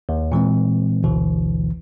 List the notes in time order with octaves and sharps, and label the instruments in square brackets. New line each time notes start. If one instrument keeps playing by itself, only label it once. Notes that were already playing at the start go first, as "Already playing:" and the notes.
[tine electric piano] D#2
A#2 E3 G#3 C4
G#1 D2 B2 D3 E3